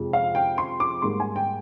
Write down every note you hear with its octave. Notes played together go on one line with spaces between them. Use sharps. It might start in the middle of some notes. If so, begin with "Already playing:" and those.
Already playing: F2 C3 F3 G#3
F5
G5
C6
D6
G#2 G3 A#3 C6
G#5
G5